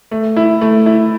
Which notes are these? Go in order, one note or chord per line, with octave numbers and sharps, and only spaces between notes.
A3
E4
A3
E4